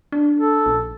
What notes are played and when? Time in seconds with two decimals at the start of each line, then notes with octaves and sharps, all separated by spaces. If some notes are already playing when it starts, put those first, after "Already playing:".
0.12 D4
0.39 A4
0.66 A#1